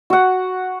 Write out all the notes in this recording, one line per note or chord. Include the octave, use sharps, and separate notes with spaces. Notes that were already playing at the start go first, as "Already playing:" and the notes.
F#4 F#5